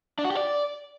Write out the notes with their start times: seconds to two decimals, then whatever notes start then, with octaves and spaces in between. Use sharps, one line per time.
0.19 D4
0.25 F#4
0.31 G4
0.37 D5